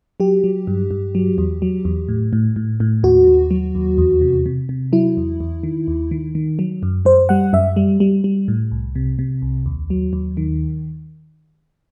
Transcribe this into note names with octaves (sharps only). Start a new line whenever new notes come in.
F#3 G4
F#3
G2
G2
F#3
E2
F#3
E2
A2
A2
A2
A2
D#2 F#4
D#2
F#3
D#2
E2
C3
C3
C3
F#3 E4
E2
E2
D#3
D#2
D#3
D#3
F#3
F#2
F#2 C5
G3 F#5
F#2 E5
G3
G3
G3
A2
C2
C3
C3
C2
D#2
F#3
D#2
D#3